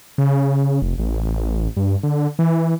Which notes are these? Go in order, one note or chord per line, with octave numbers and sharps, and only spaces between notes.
C#3
F1
A1
G2
D3
E3